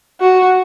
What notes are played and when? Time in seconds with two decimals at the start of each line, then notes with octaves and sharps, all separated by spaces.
0.21 F#4